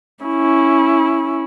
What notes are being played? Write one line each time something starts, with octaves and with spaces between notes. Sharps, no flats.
C#4 E4